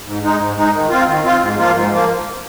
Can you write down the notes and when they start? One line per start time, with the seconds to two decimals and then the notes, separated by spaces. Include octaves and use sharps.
0.05 G#2
0.23 G#3 D#4
0.39 G#2
0.56 G#3 D#4
0.73 D#3
0.90 C4 F4
1.07 D#3
1.23 C4 F4
1.41 G#2
1.57 F3 A#3 F4
1.75 G#2
1.91 F3 A#3